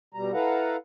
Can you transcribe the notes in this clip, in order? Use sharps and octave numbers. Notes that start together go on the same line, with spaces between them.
B2 G3 A#5
E4 A4 B4 F5 F#5 A#5